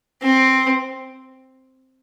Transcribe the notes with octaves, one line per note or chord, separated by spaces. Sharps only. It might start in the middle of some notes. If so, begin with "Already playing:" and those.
C4